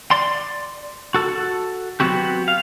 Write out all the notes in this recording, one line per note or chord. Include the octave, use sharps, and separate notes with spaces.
D5 C6
F#4 A4
F#3 G3 B3 C4 F#4 G4
F5